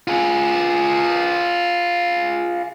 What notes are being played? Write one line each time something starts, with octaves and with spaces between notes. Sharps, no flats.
F4 G#4